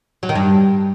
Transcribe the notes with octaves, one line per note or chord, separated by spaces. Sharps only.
F#3
D#3
G2